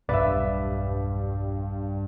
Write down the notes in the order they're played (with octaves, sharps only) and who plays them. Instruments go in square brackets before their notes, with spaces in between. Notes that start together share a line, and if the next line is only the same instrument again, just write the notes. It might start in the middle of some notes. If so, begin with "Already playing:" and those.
[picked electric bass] E1 B1 [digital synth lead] G2 [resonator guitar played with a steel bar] B4 E5 [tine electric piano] D5 F5